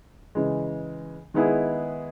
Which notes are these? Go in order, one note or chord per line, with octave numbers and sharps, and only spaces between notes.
C#3 E3 G#3
D#3 G#3 B3 E4 G#4